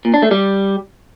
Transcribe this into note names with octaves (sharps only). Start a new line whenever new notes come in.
A#2
D4
A3
G3